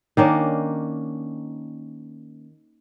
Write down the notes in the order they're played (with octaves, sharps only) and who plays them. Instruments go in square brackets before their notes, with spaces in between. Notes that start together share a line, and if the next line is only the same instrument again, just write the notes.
[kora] D#3 A#3 C#4 D4